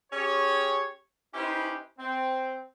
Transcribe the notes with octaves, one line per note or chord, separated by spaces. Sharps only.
C#4 G4 G#4 C#5
C#4 D#4 E4 G4 B4 C5
C4